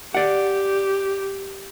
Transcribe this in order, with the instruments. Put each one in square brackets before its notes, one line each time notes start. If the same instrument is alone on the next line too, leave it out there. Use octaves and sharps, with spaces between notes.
[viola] G4 [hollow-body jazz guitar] D5 F#5